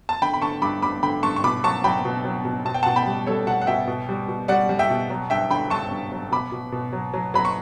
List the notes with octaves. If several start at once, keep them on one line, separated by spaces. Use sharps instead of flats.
A5
D3 G5 B5
B5
D3 A5 C#6
G2 B5 D6
G2 B5 D6
D3 G5 B5
G2 A5 C#6
C#6
B2 B5 D6
F#3 A5 C#6
F#3 G5 B5
B2
F#3
B2
B2 A5
G5
B2 F#5 A5
G5 B5
G3
G3 A4 C#5
B2 F#5 A5
F#5
B2 E5 G5
B2
G3
B2
G3 D5 F#5
G3
E5 G5
B2
F#3
G2 E5 G5
D3 G5 B5
G2 A5 C#6
G2
F#3
B2 B5 D6
B2
B2
F#3
F#3
F#3 B5
C#6